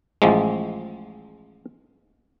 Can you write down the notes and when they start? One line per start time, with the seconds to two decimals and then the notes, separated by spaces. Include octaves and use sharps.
0.22 A1 F3 G#3